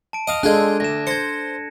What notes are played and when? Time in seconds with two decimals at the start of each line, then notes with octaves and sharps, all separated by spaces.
0.13 A5 D7
0.27 D#5 F5 D#7
0.43 G#3 D4 F4 G#4 A4 F#6 G#6
0.80 D2 A#6 E7
1.07 C5 G#6 A#6 C#7